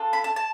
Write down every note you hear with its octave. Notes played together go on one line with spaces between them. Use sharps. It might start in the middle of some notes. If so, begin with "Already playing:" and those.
Already playing: D4 F4 A4
B5
A5
A5